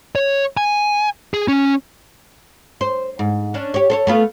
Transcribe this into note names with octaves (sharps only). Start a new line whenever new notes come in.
C#5
G#5
G#4
C#4
C5
G#2
C#4 D4
G4 C#5
A4 C5 C#5
A3 B3 F4